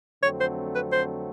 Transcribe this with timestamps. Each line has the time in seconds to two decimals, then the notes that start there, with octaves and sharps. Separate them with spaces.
0.23 F2 D3 F#3 A3 C4 C#5
0.41 C5
0.75 B4
0.92 C5